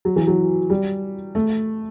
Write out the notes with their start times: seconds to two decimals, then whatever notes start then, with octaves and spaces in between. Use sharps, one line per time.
0.05 F#3
0.16 E3
0.27 F#3
0.70 G3
1.35 A3